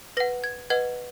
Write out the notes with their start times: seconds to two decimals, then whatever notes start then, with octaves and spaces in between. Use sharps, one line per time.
0.17 B4 A#6
0.20 F#5
0.44 G#6
0.70 B4 D#5 F#5 G#6